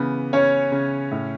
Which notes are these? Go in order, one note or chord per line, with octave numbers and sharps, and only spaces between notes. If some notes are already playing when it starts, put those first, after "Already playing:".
Already playing: C#3 E3 B3
C#3 C#4 C#5
C#3
A2